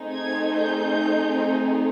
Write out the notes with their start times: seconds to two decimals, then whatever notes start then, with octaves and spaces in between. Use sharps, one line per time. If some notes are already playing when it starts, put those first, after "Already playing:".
Already playing: A3 C4 D#4 G#4
0.13 G#6
0.57 G6